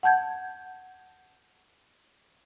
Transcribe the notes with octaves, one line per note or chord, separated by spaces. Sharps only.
F#5 A5 G6 G#6